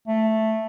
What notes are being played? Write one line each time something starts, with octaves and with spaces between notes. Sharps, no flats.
A3